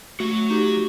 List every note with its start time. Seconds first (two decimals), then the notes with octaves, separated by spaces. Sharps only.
0.20 F#3 A3 F#4
0.50 D#4 G4